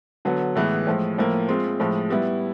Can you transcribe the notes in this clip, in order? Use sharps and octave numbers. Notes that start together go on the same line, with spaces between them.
D3 F#3 B3
A2 E3 G#3 B3
A2 F3 G#3
A2 F3 A#3
G#3 C4 F4
A2 F3 G#3
G3 B3 E4